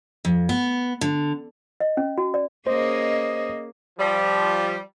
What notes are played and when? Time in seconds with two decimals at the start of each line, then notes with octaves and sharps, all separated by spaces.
0.25 F2
0.49 B3
1.01 D3
1.80 D#5
1.97 C#4
2.18 F#4
2.34 D5
2.67 A#3 C#4 G#4 C5 D#5
3.99 F3 G3